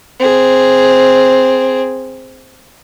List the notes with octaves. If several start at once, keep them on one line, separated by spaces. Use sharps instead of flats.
C4 G#4